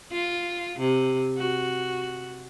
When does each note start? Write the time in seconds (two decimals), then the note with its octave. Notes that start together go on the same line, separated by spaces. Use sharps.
0.12 F4
0.79 C3
1.37 F#4